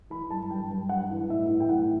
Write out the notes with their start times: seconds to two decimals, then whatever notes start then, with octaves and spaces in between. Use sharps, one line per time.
0.10 E3 B5
0.30 G2 A5
0.51 G2 G5
0.71 G2
0.89 G2 F#5
1.10 E3
1.30 A2 E5
1.49 E3
1.60 G5
1.69 A2 F#5